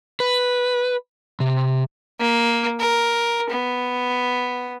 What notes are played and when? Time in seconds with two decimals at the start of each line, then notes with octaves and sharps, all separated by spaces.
0.20 B4
1.40 C3
2.20 A#3
2.80 A#4
3.51 B3